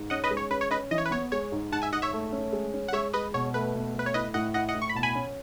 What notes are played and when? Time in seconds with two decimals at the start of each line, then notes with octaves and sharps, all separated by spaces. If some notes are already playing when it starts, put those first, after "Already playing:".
Already playing: G#2
0.10 C#4 D#5 F#5
0.24 B4 D#5
0.31 G#3
0.37 C#5
0.50 C#4 B4
0.61 C#5
0.71 C#4 B4 D#5
0.91 E3 D#5
0.98 C#5
1.06 B4
1.11 B3 C#5
1.32 G#3 C#5
1.52 G#2
1.72 G#2 F#5 A5
1.82 E5 G#5
1.92 G#2 D#5 F#5
2.02 C#5 E5
2.13 A3
2.33 C#4
2.53 G#3
2.74 C#4
2.88 F#5
2.93 G#3 C#5 E5
3.13 G#3 B4 D#5
3.34 B2 C#5
3.54 A3 B4
3.75 B2
3.95 A3 B4
4.06 C#5
4.14 E4 B4 D#5
4.34 A2 D#5 F#5
4.54 E4 D#5 F#5
4.69 D#5 F#5
4.75 A2
4.82 C#6
4.89 B5
4.95 B2 A5
5.03 G#5 B5
5.15 C#4